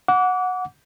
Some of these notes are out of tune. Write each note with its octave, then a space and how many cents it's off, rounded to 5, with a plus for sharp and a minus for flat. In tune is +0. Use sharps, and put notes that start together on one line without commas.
F#5 -15 D6 -35